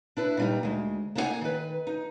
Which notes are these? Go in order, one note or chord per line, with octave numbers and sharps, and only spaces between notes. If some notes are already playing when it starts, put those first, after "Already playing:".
D4 E4 B4
A#2 G3 D#4
D2 G#3
A#3 B3 D#4 E4 F#5 G#5
D#3 B4
D#4